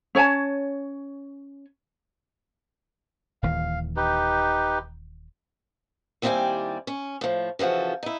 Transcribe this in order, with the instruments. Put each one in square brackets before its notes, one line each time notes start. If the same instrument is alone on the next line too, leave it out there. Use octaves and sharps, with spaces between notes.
[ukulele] C#4 C#5 G#5 A5
[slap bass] D#1 D#2 E3 [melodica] F5
[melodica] D#4 G4 B4
[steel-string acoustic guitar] D#2 G3 C4 E4 D5 G#5
C#4
A2 F3
C#3 E3 F3 F#4 A4
D#4 E4